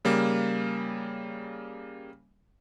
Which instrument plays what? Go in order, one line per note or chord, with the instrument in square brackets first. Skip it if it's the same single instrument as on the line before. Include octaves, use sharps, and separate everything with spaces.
[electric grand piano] C#3 G3 A#3